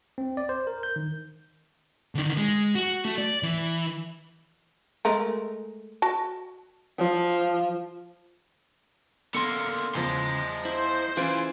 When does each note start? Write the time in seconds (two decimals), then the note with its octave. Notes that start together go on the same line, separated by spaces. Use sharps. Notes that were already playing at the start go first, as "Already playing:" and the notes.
0.18 C4
0.37 D5
0.49 C5
0.67 A#4
0.83 G6
0.96 D#3
2.15 D3 D#3
2.37 G#3
2.75 F#4
3.05 A3
3.18 D5
3.43 E3
5.05 G#3 A3 A#4
6.02 F#4 A5
6.99 F3
9.35 D3 A#3 B3 A4 A#4 C6 C#7
9.95 E2 C#3 F3 D#5 C6
10.65 E4 C5
11.17 E3 C#4 E4 F4 G#4 D7